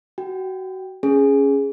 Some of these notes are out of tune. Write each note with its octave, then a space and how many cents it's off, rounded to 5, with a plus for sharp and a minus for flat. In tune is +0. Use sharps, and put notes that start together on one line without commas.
F#4 +20 G5 +0
C#4 +0 G#4 +0